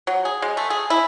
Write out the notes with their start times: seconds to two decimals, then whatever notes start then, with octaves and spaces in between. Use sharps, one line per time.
0.07 F#3
0.25 G#4
0.42 G#3
0.57 A3
0.70 G#4
0.90 E4